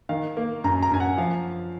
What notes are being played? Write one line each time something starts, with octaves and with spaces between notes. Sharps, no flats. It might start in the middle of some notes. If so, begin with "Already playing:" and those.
D#3 F5
A#3
F#2 A#5
A#5
F#2 G#5
F#5
F3 F5